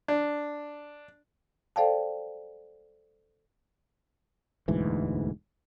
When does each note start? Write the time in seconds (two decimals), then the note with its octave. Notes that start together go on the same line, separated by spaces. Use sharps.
0.08 D4
1.76 A4 C5 D5 F5 G5 A5
4.68 E1 D2 G#2 E3